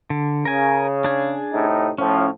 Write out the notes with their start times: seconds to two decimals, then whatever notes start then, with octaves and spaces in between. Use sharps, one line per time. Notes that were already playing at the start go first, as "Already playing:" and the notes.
0.10 D3
0.45 C#3 A#4 G#5
1.04 D4 G#4
1.53 A2 C3 D#4
1.98 A2 F3 C#4